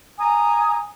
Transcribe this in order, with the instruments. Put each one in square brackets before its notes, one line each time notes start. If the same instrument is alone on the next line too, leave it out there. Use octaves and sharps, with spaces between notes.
[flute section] G#5 A#5 D#6